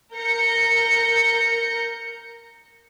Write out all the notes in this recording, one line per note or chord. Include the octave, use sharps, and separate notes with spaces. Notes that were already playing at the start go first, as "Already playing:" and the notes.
A#4 G6 A#6 C#7